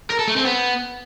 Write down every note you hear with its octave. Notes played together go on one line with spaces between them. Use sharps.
A#4
A4
A3
C4
B3